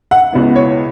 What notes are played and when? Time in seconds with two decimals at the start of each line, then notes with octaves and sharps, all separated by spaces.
0.11 F#5
0.33 C#2 B2 B3 E4
0.55 C#5